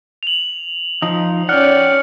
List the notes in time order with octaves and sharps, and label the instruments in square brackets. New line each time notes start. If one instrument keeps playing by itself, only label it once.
[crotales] F7 F#7
[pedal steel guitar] F3 D#4 [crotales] D#6
[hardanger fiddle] C#4 D5 [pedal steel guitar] F#5 G5 [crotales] F6 C#7